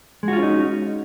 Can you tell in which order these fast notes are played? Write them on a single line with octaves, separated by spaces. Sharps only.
G#3 F#4 F4 C#4 D#4